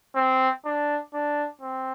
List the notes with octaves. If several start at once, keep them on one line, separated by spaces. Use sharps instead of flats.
C4
D4
D4
C4